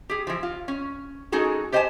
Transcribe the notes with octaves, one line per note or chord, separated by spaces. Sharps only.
G4 G#4
E3 F3
F4
C#4
G#3 C#4 D#4 F#4 G#4 A4
G4 C5 D#5 F#5 G#5 A5